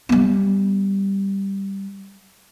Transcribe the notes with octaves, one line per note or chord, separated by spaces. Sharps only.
G3 B3